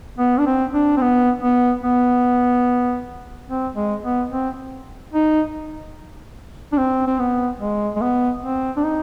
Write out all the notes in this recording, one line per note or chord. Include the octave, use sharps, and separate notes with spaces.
B3
D4
C4
D4
C4
B3
B3
B3
C4
G#3
B3
C4
D#4
D4
C4
C4
B3
G#3
G#3
B3
C4
D4
D#4